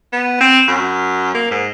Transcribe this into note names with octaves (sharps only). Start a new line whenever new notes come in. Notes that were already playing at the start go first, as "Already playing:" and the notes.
B3
C4
F#2
A#3
G#2